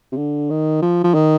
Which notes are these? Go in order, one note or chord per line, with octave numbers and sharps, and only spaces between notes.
C3
D3
D#3
F3
F3
D#3